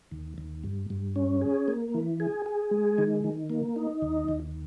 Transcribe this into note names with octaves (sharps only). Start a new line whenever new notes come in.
D#2
D#2
G2
G2
C#4
G#4
A#3
E3
G#4
G#4
G#3
D#3
D#3
A#3
D#4
D#2
D#2